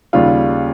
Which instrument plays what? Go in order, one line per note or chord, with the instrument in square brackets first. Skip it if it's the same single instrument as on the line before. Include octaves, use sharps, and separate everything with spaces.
[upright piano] D#2 C#3 G3 F4